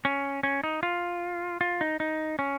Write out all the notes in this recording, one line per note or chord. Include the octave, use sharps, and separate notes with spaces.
C#4
C#4
D#4
F4
F4
D#4
D#4
C#4